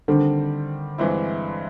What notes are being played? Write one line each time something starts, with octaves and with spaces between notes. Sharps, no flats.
D3 D#3 G3 C4
G2 E3 G#3 C4 E4